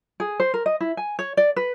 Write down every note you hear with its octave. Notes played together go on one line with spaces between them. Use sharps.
G#4
C5
A#4
D#5
E4
G#5
C#5
D5
B4